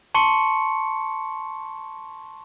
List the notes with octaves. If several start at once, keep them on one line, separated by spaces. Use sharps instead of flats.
A5 C6 C#6 C#7